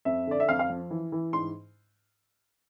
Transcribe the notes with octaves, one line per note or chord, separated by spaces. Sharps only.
F2 E5
D3 D5
E5
F2 F5
F5
F3
E3
E3
G#2 C6